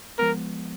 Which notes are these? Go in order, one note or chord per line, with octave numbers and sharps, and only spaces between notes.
F3 G#3 B3 A#4